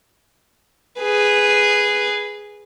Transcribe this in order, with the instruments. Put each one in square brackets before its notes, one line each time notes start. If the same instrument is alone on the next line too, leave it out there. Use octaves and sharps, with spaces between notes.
[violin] G#4 B4